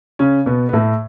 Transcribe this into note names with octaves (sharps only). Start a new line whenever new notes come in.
C#3 C#4
B2 B3
B3
A2 A3